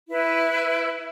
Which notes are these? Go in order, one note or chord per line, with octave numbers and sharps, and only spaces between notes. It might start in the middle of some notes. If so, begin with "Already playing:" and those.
E4 B4